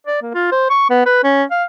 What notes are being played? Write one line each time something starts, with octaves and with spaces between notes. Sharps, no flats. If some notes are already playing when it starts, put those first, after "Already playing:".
D5
A#3
F4
C5
C#6
B3
B4
C#4
F5